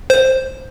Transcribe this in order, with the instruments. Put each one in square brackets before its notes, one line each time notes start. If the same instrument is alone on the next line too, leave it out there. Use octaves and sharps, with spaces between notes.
[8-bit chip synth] C5